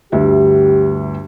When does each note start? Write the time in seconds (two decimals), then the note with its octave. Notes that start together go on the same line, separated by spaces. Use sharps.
0.12 G1 D2 G4 E5